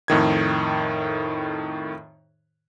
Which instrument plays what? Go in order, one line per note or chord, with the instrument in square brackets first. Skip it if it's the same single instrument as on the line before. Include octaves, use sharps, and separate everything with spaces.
[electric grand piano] F2 A2 D#3 G#6